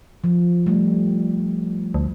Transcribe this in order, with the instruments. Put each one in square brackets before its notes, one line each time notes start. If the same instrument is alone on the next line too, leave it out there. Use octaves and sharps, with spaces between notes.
[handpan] F3
G3 A3
[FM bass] D2